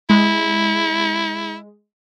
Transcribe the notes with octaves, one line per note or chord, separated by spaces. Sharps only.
G#3 E4